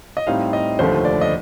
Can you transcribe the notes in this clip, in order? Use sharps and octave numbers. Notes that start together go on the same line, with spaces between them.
D#5
A2 G3 C4 D#4 F5
D#5
F1 D#2 D3 F3 A3 C5
D5
D#5